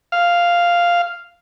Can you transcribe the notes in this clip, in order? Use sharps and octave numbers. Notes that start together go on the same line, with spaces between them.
F5